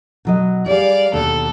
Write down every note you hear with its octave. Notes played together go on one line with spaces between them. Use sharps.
B2 F#3 D#5
G3 G#4 D5 F5
D#2 B2 D3 A4